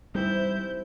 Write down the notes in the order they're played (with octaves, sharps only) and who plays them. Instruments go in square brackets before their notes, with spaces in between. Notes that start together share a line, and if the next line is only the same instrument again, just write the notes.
[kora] G#2 C3 E3 [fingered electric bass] G3 [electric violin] E4 G6